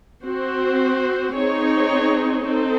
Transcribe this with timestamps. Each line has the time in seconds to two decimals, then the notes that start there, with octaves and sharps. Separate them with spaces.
0.22 C4 F#4 C5
1.34 C4 D#4 G#4 C#5
2.45 C4 D#4 A4